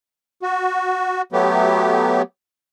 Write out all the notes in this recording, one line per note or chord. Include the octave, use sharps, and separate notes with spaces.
F#4
F#3 A3 B3 G4